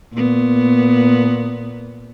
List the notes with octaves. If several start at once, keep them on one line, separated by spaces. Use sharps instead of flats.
A#2 B3